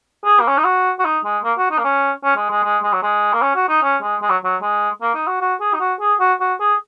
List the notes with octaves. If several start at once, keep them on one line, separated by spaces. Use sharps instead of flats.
G#4
A#3
C#4
D#4
F#4
F#4
D#4
G#3
A#3
F#4
D#4
A#3
C#4
C#4
G#3
G#3
G#3
G#3
F#3
G#3
A#3
C#4
F#4
D#4
C#4
G#3
G#3
F#3
F#3
G#3
A#3
D#4
F#4
F#4
G#4
D#4
F#4
G#4
F#4
F#4
G#4